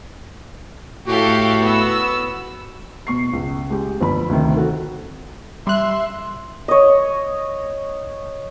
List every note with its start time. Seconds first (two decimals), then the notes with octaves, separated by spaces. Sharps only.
1.07 A2 F#4 G4 A4 F5
1.61 B3 E6
3.07 B2 C#6 C7
3.33 C#2
3.70 G#3 G4
4.01 G1 F3 B5
4.29 D2 C3 D#3
4.57 F#4 A4
5.67 G3 E5 C6 F#6
6.68 C#5 D#5